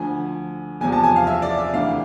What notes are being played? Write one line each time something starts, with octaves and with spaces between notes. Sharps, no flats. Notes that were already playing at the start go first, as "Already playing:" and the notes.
Already playing: D2 D3 F3 G#5
E2 C3 F3 G#5
A5
G#5
F5
E5
D5
E5
D2 C3 E3 F5